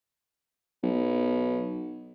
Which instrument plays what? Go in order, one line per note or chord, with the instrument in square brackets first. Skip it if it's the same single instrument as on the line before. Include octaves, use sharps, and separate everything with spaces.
[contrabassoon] B1